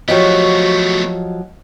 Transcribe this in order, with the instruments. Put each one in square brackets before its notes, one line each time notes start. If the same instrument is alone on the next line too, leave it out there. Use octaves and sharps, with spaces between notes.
[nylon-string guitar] F3 F#3 G4 [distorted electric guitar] A3 B3 [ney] F#4 [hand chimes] D#5